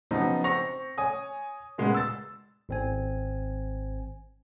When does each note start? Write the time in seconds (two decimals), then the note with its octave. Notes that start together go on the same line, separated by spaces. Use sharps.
0.11 C#3 F3 F#3 B3 C4 D#4
0.44 C4 C#6 A#6 F7
0.98 C#5 G#5 D#6
1.78 A#2 C#3 G#3 B3
1.94 E6 A6
2.69 G#1 C4 G#5